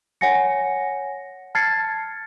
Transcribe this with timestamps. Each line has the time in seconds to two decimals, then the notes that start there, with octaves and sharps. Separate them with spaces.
0.21 C#5 F#5 G#5 A#6 C#7
1.55 A5 F6 G#6 A6 C7 C#7